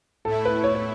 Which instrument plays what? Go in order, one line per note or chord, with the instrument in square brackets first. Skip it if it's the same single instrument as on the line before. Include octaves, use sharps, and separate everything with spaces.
[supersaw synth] A2 A3 E4 [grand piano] A4
[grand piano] B4
C#5
C#5